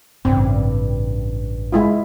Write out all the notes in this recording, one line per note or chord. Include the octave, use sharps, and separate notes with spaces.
A1 G2 C#3 C4
G#3 E4 F4